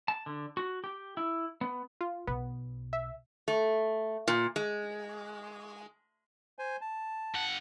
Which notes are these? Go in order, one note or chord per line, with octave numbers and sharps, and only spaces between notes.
A5
D3
F#4
G4
E4
B3
F4
B1 B3
E5
A3
A#2
G#3
C5 G#5
A5
G2 F#5